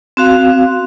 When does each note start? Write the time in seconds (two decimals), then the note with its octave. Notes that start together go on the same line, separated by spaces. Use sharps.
0.17 C4 F#4 F5